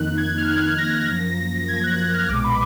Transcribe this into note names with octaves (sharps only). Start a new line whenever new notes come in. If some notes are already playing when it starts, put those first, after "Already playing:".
Already playing: F2 D#3 A#3 D#4 F#6
G#6
F6
F2 D#3 A#3 D#4 F#6
A#6
F#2 F3 A#3
F#2 F3 A#3 G#6
F#6
F#6
F6
B1 A#2 G#3 B3 D6
B5